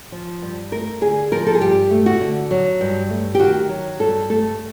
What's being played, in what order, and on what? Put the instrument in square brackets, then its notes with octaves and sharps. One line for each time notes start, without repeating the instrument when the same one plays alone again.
[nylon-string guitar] F3
G2
A3 A#4
D3 G#4
F3 A#4
A4
G#4
G2 G4
A3
F#4
D3
F#3
G2
A3
G4
D#3 F#4
F#3
G2 A4
A3 A4